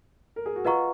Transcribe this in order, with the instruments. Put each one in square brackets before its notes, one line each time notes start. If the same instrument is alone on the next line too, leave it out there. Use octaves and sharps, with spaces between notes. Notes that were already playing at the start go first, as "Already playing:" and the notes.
[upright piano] A#4
G#4
F#4
[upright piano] F4 [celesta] B4 D#5 F#5 A#5 C#6